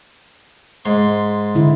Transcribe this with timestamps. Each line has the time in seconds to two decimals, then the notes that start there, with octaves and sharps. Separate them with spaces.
0.85 G#2 C6
1.55 D3 E4